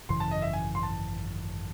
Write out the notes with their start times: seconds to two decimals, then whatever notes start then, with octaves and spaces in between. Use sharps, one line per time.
0.09 G#1 F#2 C#3 E3 C6
0.20 A5
0.31 D#5
0.42 E5
0.53 G#5
0.75 C6
0.83 A5